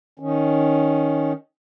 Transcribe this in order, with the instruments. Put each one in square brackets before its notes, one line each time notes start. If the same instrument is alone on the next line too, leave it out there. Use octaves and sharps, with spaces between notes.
[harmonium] D#3 C#4